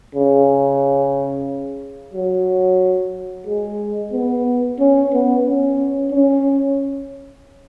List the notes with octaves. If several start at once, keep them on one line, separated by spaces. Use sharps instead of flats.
C#3
F#3
G#3
B3
C#4
B3
C#4
C#4